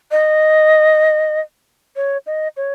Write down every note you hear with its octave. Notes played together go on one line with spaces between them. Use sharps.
D#5
C#5
D#5
C#5